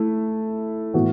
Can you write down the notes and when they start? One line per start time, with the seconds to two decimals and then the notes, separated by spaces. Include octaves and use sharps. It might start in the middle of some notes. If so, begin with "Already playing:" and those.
Already playing: A3 E4 A4
0.94 A2 E3 B3 F#4